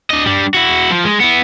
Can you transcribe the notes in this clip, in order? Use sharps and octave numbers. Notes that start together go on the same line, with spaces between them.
D4 D#5
G3 D4
E4 F#4
F3
G#3
B3 E4